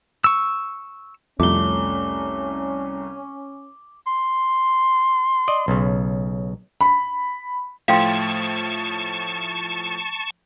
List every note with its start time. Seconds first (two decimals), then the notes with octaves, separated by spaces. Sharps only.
0.24 C#6 E6
1.40 C2 F2 A3 C#4 D6 G7
4.07 C6
5.48 D5 D#5
5.68 B1 C#3
6.81 B5
7.88 A2 F3 A3 F5 G5 A5 C6 C#6